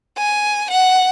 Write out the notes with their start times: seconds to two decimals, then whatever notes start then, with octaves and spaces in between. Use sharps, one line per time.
0.18 G#5
0.70 F#5